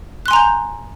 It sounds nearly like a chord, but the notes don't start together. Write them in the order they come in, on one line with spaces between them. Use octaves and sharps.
F#6 C6 G#5 A#5 G6